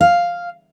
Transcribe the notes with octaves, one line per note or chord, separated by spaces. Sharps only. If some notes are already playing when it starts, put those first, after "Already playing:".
F5